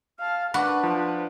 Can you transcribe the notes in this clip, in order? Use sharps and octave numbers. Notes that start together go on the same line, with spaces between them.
F5 A5 F6
D4 F#4 B4 B5 D6
F3 C5